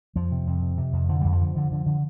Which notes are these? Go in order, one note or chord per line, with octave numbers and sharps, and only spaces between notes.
F2 F3
C3
F2
C3
C3
F2
D3 F3
F2 G3
F3
D3
D3
D3
D3